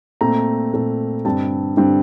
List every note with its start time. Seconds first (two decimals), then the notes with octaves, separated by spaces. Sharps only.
0.21 A#2 A3 C4 A#5
0.73 A#2 A3 C4
1.25 G2 D3 G3 C4 A5
1.77 G2 D3 G3 C4